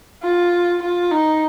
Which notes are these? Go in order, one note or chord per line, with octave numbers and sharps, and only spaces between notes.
F4
F4
D#4